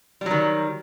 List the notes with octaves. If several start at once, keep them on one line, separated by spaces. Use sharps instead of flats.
D#3 F#3 G3